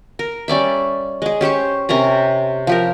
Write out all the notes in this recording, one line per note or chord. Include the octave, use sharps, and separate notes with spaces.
A#4
G3 C#4 D5 E5
G#3 G#4
C#4 G4 C5 C#6
C3 C#4 A#4 A#5
F3 G4 A#4